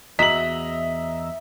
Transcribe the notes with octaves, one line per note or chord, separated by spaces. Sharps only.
E2 F#4 D#5 E5 A#5 B6 F#7